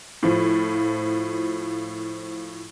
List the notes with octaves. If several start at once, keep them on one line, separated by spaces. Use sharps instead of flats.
A2 F3